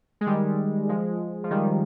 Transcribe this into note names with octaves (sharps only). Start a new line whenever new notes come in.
G#3
D#3 G3
F3 G#3
F3
D#3 G3